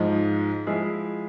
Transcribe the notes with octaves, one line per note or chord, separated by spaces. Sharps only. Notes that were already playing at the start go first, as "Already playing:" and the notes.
Already playing: G#2 F3 G#3
F3 G#3 E4 G#4